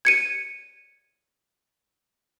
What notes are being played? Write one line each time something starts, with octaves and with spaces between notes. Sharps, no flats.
G#6 C#7 D#7